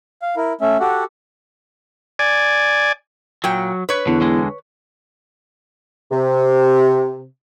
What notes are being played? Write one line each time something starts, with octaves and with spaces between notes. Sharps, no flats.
F5
E4 A#4
A3 C#4 E5
F#4 G4 A4 F#5
D5 G#5
A#2 F#3 G5
B4 C#5
E2 D3
D3 G#3
C3